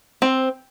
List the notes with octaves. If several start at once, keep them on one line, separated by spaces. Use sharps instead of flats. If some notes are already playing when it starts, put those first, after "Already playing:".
C4